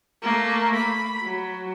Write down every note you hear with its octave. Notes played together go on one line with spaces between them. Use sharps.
A3 A#3
B5
F#3